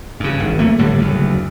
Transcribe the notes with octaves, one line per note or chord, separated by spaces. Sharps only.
G2 C#3
G#1
A3 A#3
G1 A2 D3 G3
F#1 D2